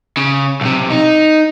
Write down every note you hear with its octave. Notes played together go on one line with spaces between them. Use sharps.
C#3
B1 C3
D#4